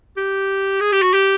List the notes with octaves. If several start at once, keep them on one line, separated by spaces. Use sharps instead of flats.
G4
G#4
G4
F#4
G4